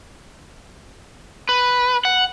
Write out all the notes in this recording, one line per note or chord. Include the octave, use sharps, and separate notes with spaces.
B4
F#5